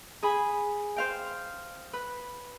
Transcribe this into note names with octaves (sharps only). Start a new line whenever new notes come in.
G#4 G#5 B5
C5 F5 G5
B4